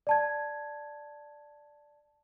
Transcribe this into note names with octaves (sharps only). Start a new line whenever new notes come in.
D5 A5 G#6